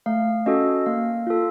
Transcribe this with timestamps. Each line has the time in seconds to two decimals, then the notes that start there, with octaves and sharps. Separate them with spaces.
0.06 A3 F5
0.46 C#4 F#4 A4 D#5
0.86 A#3 F5
1.27 F4 A4